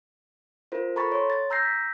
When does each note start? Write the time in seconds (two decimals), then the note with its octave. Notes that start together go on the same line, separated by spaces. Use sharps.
0.72 F4 A#4 C5
0.96 A4 A#5 B5 C#6 A6
1.12 C#5 C6
1.30 A6
1.50 A#5 E6 G6 A#6 C7
1.63 B6